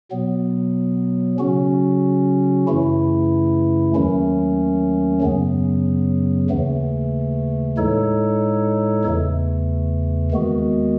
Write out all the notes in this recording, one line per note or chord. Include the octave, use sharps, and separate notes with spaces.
B2 F#3 B3
C#3 F#3 C#4 F#4
F#2 C#3 E3 A3 E4
D#2 D#3 F#3 A3 C#4
F#2 C#3 F#3 B3
D#2 C#3 E3 A3
A2 G#3 D#4 A4 C#5
E2 C#3 E3 A3
D#2 D#3 G#3 B3 F#4